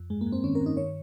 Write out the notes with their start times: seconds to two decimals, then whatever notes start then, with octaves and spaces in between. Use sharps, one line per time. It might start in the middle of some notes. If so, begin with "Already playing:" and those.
Already playing: F2
0.10 G2 G#3
0.21 A#3
0.26 G2
0.32 C4
0.44 D#3 C#4
0.55 A#4
0.61 G2
0.66 D#4
0.77 D#3 C#5